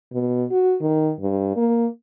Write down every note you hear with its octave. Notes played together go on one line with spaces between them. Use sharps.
B2
F#4
D#3
G2
A#3